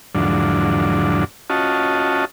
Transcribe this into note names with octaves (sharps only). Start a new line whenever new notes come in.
E2 G#2 D3 F3 F#3 D4
C#4 F4 F#4 D#5 A5